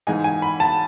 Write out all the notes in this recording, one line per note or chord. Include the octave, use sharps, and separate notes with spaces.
G#2 E3 G#3 D#4 G#5
G#5
B5
A5